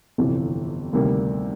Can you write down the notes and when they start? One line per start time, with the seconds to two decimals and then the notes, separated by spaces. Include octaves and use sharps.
0.18 G1 F2 C3 E3
0.93 D2 C3 D#3 G3 A#3